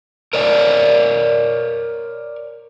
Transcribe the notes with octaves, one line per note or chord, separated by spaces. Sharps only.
A#4 C#5 D5 G#5